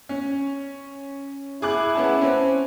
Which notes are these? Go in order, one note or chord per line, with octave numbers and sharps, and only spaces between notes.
C#4
E4 G#4 D6 F#6
B3 C#4 A5
C4 C#4